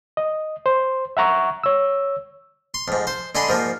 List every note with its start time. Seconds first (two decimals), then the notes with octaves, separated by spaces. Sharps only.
0.17 D#5
0.66 C5
1.17 E5 F#5 A#5 C#6
1.63 C#5 E6
2.74 C6
2.88 F2 G#2
3.07 C5
3.35 D3 G#3 G#4 B5 C6
3.49 G#2 F3 A#3